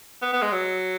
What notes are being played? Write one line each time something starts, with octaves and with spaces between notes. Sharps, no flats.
B3
B3
G#3
F#3